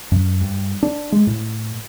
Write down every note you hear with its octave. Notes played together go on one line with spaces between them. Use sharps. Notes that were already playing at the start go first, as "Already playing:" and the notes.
F#2
G2
D4
G#3
A2